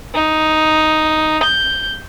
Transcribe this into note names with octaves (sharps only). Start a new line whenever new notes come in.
D#4
G6